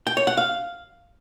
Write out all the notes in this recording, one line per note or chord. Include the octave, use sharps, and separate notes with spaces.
G5
C#5
F#5
F5